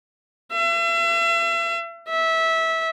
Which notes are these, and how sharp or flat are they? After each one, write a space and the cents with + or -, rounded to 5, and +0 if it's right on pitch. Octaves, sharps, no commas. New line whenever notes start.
E5 +40
E5 -20